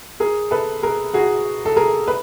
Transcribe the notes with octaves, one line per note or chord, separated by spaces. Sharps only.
G#4 A#4
A4 B4
G#4 A#4
F#4 G#4
A4
G#4 A#4
B4